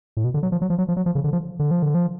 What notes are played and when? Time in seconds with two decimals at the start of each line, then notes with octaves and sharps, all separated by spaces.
0.17 A2
0.25 B2
0.34 D3
0.43 F#3
0.52 F3
0.62 F#3
0.70 F3
0.78 F#3
0.88 F3
0.97 F#3
1.06 F3
1.15 C#3
1.24 D3
1.33 F3
1.59 D3
1.71 F3
1.83 D3
1.95 F3